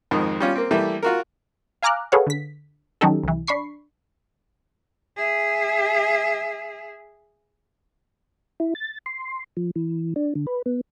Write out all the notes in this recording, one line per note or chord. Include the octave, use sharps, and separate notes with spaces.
F2 G#2 D#3
G3 C#4 F4
A#3 C4
E3 G3 A3 A#3
F4 F#4 A#4
F5 G#5 A#5 D6 F6 F#6
G#4 A4 B4 C#5 F5 F#5
D3 B6
D#3 F#3 C#4 D#4 G4 A4
C2 E3
D4 B5 C#6 C7
G#4 E5
E4
A6
C6
F3
E3
D4
D3
B4
B3